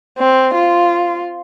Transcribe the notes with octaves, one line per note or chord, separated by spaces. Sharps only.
C4
F4